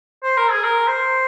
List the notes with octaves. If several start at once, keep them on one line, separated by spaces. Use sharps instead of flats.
C5
A#4
G#4
A#4
C5